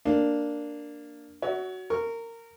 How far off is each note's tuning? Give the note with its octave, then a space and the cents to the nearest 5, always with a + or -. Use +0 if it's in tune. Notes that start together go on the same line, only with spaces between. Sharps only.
A#3 +0 D4 +0
F#4 +5 C#5 +30 E5 -35
A#4 -20 C#6 +0